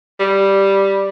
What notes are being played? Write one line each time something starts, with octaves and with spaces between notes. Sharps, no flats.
G3